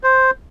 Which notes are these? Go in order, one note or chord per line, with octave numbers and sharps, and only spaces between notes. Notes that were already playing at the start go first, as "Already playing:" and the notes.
C5